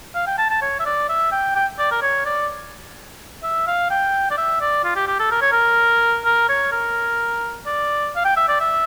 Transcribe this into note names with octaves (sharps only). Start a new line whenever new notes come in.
F5
G5
A5
A5
C#5
E5
D5
E5
G5
G5
D5
A#4
C#5
D5
E5
F5
G5
D5
E5
D5
F4
G4
G4
A4
A#4
C#5
A#4
A#4
C#5
A#4
D5
F5
G5
E5
D5
E5